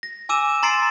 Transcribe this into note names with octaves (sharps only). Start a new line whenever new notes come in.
A#6
G#5 D6 E6 D#7 E7
A#5 C6 A6 C7 D7